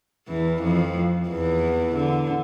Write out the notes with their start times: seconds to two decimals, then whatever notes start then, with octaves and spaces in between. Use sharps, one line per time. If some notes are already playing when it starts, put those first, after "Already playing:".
0.27 E2 E3
0.61 F2 F3
1.28 E2 E3
1.95 D3